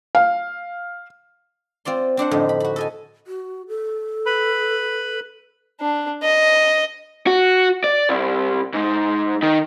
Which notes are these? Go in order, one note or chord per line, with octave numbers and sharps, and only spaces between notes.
F5
C4 F4 D5 C6
C4 D4 C5 F#5
F2 A2 D3 D#4
B5
F#4 B5
A4 D#5 G#5
F#4
A4
B4 B5
D4
D#5
F#4
D5
C2
G#2
D#3